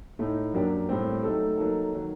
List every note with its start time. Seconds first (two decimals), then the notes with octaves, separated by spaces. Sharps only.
0.19 A2 A3 D#4
0.54 F#2 F#3 A#3 D4 G4
0.89 A2 G3 C4
1.23 F#3 A3 D#4 A4
1.57 F#3 A#3 D#4 A4
1.93 D#3 F#3